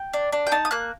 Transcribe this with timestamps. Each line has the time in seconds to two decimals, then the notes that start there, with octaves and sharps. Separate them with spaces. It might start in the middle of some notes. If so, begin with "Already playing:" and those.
Already playing: G5
0.13 D4
0.32 D4
0.47 G5
0.52 D#4 A5
0.65 D#6
0.71 A#3 F#6